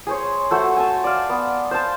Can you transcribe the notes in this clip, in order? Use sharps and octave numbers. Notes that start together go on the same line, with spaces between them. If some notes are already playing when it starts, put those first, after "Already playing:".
G#4 C5 C#5
A3 F#4 C5
G#5 A5
D5 F5
B3
C5 A5